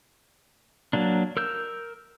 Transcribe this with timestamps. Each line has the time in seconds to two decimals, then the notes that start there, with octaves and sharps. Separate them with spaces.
0.93 F#3 A#3 D4
1.37 A#4 E6 G6